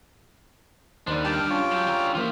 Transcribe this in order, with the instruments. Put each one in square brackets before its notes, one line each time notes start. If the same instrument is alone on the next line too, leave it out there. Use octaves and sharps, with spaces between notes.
[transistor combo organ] D#2 [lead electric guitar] D4 B4 [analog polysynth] C5 D5
[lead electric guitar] G2 [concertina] G4 G5 [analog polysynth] A5
[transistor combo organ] C#4 F4
[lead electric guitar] F#3
D3 A#5
[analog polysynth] E3 F3 A#3 [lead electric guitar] F4 E5 [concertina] G4